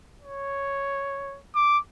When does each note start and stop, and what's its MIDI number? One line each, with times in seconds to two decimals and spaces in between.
0.22 1.40 73
1.55 1.78 86